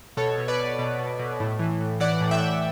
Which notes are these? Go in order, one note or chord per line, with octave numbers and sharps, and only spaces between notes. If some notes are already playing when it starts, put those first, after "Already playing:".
B2 A4 C#5
B2
B4 D5
B2
B2
B2
B2
A2
E3
A2
E3 D5 F#5
A2
E5 G5
A2